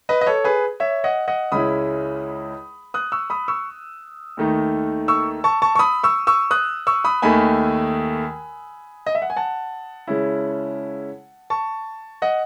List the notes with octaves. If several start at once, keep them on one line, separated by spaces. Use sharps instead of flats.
B4 D#5
D#5
A4 C#5
G#4 B4
C#5 E5
D#5 F#5
D#5 F#5
C#2 C#3 G#3 C#4 E4 B5 D#6
D#6 F#6
C#6 E6
B5 D#6
C#6 E6
D#2 D#3 A3 D#4
C#6 E6
A5 C#6
A5 C#6
C#6
B5 D#6
C#6 E6
C#6 E6
D#6 F#6
C#6 E6
B5 D#6
D#2 D#3 A3 G#5 B5
D#5
E5
F#5
G#5
F#5 A5
C#3 G#3 C#4 E4
A5 C#6
D#5 F#5